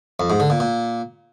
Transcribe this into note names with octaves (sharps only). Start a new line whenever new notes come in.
F2
G#2
D3
A#2
A#2